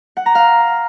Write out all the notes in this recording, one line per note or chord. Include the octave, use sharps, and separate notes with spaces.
F#5
A#5
F5